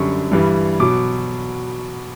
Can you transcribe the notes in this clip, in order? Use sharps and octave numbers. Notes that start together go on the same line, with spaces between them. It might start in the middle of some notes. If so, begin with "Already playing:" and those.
Already playing: F#2 D3 G3 C#6
G2 E3 G3
B2 F#3 D6